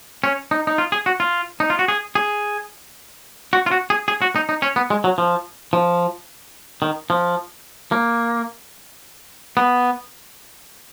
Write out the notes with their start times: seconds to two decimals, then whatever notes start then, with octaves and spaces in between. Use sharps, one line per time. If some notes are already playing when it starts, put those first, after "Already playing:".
0.24 C#4
0.51 D#4
0.67 D#4
0.78 F4
0.92 G#4
1.06 F#4
1.20 F4
1.60 D#4
1.70 F4
1.79 F#4
1.88 G#4
2.15 G#4
3.53 F#4
3.66 F4
3.71 F#4
3.90 G#4
4.08 G#4
4.22 F#4
4.36 D#4
4.49 D#4
4.62 C#4
4.76 B3
4.90 G#3
5.04 F#3
5.18 F3
5.73 F3
6.82 D#3
7.10 F3
7.92 A#3
9.57 B3